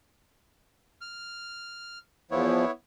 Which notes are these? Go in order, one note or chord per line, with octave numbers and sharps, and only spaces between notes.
F6
E2 F3 B3 E4 C#5